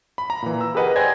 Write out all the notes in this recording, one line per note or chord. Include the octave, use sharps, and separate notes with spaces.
B5
A#5
A#2 E3
A#5 E6
G4 G#4 A#4 B4 D#5 F#5
C5 D5 G5 G#5 G#6 A#6